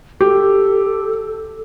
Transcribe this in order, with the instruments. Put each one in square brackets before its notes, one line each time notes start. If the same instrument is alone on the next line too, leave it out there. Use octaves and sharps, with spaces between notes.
[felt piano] G4 [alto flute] A4